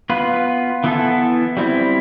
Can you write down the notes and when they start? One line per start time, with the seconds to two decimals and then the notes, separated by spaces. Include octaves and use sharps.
0.10 B3 F4 B4
0.84 E3 B3 E4 A4
1.57 G3 C4 E4